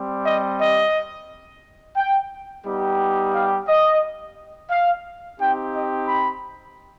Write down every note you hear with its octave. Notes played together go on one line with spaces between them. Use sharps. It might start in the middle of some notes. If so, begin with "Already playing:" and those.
Already playing: G3 C4 G4
D#5
D#5
G5
G3 B3 D#4 G4
F5
D#5
F5
C4 D#4 G4 G5
D#5
B5